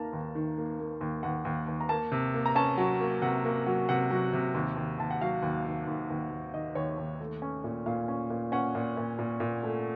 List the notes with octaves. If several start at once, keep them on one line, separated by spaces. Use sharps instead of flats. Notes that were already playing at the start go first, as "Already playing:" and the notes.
Already playing: D#2 D#3 A#3 F5 A5 A#5
D#2
D#3
A#3
A#3
D#2
D#2 F#5
D#2
D#2
A#5
A#3 A5
C3
A#3
A#5
C#4 A5
F#3
A#3
C3 F#5
A#3
F#3
C3 F#5
F#3
C3
D#2
D#2
D#2 A5
F#5
F#3 F5
D#2
D#3
D#2
D#2
D#2
D#3 D#5
D#2 C#5
D#2
A3
C#4
A#2
A#2 F5
C#4
A#2
C#4 F#5
A#2
A#2
A#2
A#2
A3